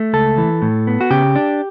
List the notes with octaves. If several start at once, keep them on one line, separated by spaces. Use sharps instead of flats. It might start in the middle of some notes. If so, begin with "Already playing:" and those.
Already playing: A3
C#2 A4
E3
A2
B3
F#4
C#3 G4
D4